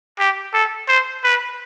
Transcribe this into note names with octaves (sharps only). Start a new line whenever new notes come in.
G4
A4
C5
B4